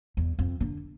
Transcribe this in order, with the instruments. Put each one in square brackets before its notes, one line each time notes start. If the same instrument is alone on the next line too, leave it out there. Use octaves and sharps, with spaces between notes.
[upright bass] E2
F2
D3